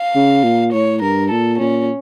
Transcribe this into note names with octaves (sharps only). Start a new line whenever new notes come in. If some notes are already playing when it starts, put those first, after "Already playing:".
Already playing: F5
C#3
A#2
A2 C#5
G2 A#4
A#2 A4
A#2 C#4